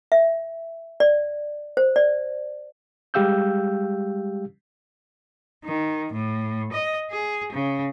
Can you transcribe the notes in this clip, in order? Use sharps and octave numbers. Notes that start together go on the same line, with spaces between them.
E5
D5
C5
D5
G3 G#3 G4 F5 E6 G6
D#3
A2
D#5
G#4
C#3